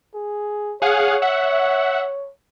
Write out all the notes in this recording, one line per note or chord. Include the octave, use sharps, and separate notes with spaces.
G#4
G#4 C#5 F5 F#5
E5 F#5